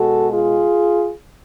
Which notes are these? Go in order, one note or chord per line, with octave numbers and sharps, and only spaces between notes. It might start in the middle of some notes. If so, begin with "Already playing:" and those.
Already playing: B2 G#3 F#4 A4
F4 G#4